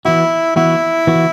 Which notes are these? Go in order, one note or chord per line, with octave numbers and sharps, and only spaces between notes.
E3 B3 E4 F#4
E3 B3 E4 F#4
E3 B3 F#4